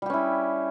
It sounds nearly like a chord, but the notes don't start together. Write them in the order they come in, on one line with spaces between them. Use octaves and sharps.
G3 G4 C#4 E4